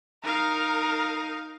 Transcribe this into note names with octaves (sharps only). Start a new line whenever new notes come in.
D#4 A#4 F5